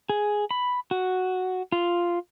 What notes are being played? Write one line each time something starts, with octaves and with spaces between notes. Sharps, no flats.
G#4
B5
F#4
F4